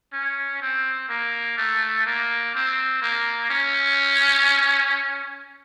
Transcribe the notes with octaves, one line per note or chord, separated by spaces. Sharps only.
C#4
C4
A#3
A3
A#3
C4
A#3
C#4